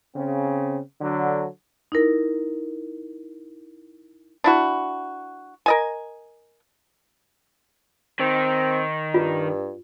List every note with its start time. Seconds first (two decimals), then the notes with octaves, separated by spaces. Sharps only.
0.15 C#3 C4
1.01 D3 F#3
1.92 D#4 E4 A#4
4.44 D4 E4 F#4
5.66 A#4 D#5 G#5
8.20 D#3 C4
9.14 G2 F4